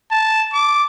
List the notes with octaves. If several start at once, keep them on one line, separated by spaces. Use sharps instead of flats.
A5
D6